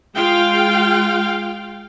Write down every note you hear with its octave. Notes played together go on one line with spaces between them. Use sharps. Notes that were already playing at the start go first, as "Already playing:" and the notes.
G#3 F4 F5 G5